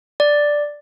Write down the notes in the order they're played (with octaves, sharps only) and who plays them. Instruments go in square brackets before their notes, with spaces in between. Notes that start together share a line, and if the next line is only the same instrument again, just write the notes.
[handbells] D5